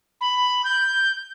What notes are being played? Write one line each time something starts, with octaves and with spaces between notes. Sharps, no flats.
B5
G6